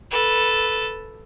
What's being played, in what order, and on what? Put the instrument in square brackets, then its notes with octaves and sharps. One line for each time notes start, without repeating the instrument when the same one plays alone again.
[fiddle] A4 B4